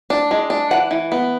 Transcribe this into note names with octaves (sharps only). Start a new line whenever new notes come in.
D4
G#3
D4
E3 F#5
E3
B3